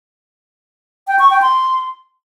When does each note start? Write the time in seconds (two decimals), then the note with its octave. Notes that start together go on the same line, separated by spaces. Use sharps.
1.08 G5
1.19 C#6
1.31 G5
1.42 C6